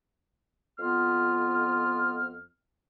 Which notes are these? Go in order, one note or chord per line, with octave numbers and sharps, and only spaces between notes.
F2 B3 F4 F6